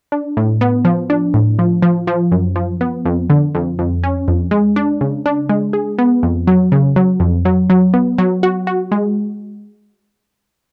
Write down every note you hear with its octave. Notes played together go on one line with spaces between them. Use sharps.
D4
A2
B3
F3
D4
A2
F3
F3
F3
F#2
F3
B3
F2
D3
F2
F2
C#4
F2
G#3
D4
C#3
D4
G#3
G#4
B3
F2
F#3
C#3
F#3
F2
F#3
F#3
B3
F#3
F#4
F#4
G#3